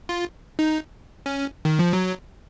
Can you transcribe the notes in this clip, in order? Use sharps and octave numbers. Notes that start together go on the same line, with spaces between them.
F4
D#4
C#4
D#3
F3
F#3